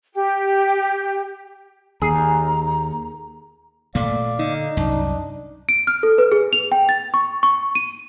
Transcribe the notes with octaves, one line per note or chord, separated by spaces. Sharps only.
G4
D#2 G#4 A#5
A#2 A3 D5 F5
D3 D#4
C2 F#2 D4
D7
F6
A4
B4
G#4
F7
G5
A6
C#6
C#6
D#7